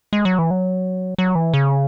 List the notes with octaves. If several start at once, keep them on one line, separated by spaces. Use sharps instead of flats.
G#3
F#3
E3
F#3
F#3
E3
C#3